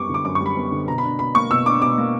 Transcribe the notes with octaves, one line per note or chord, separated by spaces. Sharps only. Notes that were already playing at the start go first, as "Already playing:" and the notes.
Already playing: F#2 G3 B3 C#6 D6
D3
D6
F#2 D6
C#6
G3
B5
B3
D3
B2 A#5
B5
D4
B2 B5
A#3 C#6
B2 E6
D4 D6
B2 D6
A#3